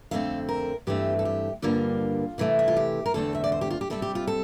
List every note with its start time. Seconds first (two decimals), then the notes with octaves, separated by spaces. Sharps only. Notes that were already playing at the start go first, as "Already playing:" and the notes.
0.11 F2 D3 A3 C4 F5
0.49 A#4
0.87 G2 E3 A3 C4 G4
1.19 A4
1.25 G4
1.62 G2 D3 G3 A#3 F4
2.38 C3 E3 A3
2.59 E4
2.68 F4
2.77 G4
3.06 A#4
3.14 E2 D3 A3 C4 A4
3.35 E5
3.44 D5
3.52 C5
3.61 G4
3.70 F4
3.81 G4
3.90 C3 G3 C4 A4
4.02 G4
4.15 F4
4.27 A4